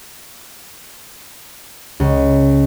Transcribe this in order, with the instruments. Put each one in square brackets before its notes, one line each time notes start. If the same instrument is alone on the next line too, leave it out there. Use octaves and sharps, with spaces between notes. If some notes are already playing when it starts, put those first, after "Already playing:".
[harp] C#2